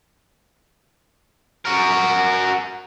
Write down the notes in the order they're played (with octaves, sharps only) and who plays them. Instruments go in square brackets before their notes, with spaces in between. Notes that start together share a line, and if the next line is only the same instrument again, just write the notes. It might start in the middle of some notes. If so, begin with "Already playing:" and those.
[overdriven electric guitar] F#4 A#4